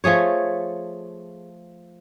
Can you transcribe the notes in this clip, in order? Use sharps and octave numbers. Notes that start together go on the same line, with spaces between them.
F3 A3 G#4 C#5